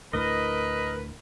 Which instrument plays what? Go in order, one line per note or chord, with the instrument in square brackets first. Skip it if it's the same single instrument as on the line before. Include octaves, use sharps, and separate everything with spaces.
[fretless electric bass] D2 A2 [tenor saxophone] A#4 [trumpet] B4 [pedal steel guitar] D#5